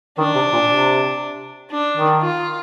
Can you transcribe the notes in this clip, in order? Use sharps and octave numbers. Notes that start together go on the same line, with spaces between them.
D#3 D4
C3
A#2
C3
D4
D#3
F4